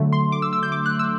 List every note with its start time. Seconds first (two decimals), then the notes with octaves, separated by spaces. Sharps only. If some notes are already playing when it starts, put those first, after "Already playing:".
Already playing: D3 F#3 A3
0.12 C6
0.32 D6
0.42 E6
0.53 E6
0.63 G6
0.72 D6
0.86 F#6
0.99 E6